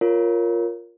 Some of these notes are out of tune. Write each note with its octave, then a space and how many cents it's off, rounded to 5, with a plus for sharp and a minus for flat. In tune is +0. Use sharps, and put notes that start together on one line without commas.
F4 +0 A#4 +0 C#5 +0